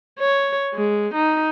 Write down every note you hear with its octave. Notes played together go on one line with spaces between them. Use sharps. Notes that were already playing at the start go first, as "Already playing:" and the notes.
C#5
G#3
D#4